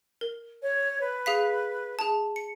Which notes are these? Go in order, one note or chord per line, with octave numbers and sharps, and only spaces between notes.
A#4
C#5
B4
G#4 F5 B6
G#4 A5
C#7